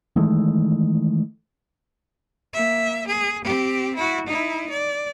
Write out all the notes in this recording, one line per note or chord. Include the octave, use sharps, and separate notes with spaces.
D#3 E3 G#3 A3
A#3 E5
G#4
C4 G4
E4 F#4
D#4 E4
D5